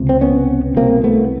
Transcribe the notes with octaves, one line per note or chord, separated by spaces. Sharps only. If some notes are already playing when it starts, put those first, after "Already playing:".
Already playing: C#2 C3
C4
B3 C#4
C2 B2 A#3 C4
A3 B3